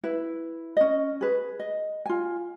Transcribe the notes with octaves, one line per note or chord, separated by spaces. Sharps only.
E4 B4
C#4 D#5
G#4 B4
D#5
F4 G#5